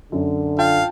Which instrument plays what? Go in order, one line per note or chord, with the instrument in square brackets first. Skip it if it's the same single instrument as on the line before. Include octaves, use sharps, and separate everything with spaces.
[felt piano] F#2 [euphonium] D3
[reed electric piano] F4 G5 A5 [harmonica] F5